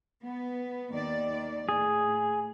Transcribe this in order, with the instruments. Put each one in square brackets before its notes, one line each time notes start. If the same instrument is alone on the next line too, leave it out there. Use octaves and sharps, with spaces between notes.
[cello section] B3
D#2 D#3 D5
[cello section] A2 [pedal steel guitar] G#4